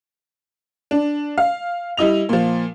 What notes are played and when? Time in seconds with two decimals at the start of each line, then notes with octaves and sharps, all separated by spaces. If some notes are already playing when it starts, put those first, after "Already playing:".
0.91 D4
1.38 F5
1.97 G3 E4 D#5 F7
2.29 A#2 F3